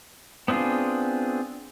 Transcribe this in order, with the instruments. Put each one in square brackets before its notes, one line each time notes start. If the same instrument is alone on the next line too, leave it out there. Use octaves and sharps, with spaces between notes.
[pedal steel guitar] B3 C4 D4 F4 G#4